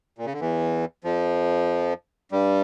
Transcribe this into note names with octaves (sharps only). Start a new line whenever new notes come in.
A#2
C#3
D3
E2 E3
F2 F3
G2 G3